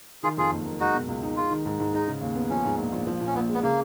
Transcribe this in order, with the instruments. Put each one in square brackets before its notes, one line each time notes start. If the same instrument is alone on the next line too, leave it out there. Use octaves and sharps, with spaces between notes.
[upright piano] D#3 [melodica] F4 G#4
[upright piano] F2 [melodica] F4 G#4
[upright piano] F#1
F#1
[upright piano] G#3 [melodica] D#4 F#4
[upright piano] B2
C#2
D#4
[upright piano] G#3 [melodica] F4
[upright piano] D#3
G#2
G#2
[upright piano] G#3 [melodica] D#4
[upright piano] C#3
D#2
B3
[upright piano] F3 [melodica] C#4
[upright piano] G#2
A#1
A#1
F3
A#2
[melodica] C#4
[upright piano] A#1 [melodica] B3
[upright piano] G#3
[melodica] B3
[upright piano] C#3 [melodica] A#3